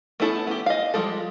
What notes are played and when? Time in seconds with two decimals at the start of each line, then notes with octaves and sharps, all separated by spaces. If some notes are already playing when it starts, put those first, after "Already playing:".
0.20 A3 B3 C#4 E4 A4
0.47 B3 G4
0.66 D#5 F5
0.94 F3 G3 G#3 A4